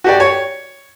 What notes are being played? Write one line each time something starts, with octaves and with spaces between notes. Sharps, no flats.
F#4 G4 D5
C#5